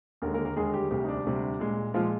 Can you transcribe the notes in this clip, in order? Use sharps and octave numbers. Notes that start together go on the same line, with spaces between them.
D#2 D3 G#3 A#3 A#4
A#3 A#4
A#3 A#4
D#2 D3 G#3 G#4
G3 G4
D2 C3 G3 G4
D#4
D4
D2 C3 G3
A#2 G#3
A#2 F3 G#3 F4